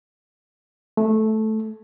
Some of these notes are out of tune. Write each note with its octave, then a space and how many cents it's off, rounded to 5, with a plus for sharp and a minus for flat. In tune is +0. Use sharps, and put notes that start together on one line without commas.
A3 -10